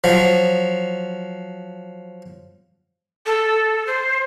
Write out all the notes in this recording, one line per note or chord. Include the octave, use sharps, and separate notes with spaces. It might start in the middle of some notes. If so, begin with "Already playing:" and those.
F3 F#3
A4
C5